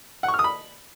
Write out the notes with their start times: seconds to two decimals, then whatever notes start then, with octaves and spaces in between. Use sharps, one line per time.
0.23 F#5
0.28 C#6
0.34 F6
0.39 D#6
0.44 B5